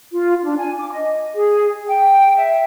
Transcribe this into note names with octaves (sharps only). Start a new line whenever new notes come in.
F4
D4
G#5
D6
D#5
G#4
G5
E5